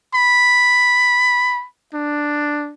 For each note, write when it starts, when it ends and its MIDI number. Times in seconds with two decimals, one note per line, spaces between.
0.15 1.66 83
1.94 2.74 62